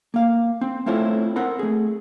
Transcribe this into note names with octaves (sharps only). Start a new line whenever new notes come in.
A#3 F5
C4
A3 C4 E4 F4 C5 C#5
C4 A#4 F#5 B5
A3 G#4